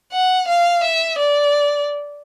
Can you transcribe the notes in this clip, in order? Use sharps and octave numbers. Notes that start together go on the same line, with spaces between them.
F#5
F5
E5
D5